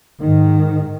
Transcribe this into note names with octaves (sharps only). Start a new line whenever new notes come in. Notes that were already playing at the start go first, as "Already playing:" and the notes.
G#2 D#3